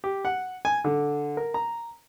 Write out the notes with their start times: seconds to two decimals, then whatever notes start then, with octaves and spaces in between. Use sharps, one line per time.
0.04 G4
0.25 F#5
0.65 G#5
0.85 D3
1.37 A#4
1.54 A#5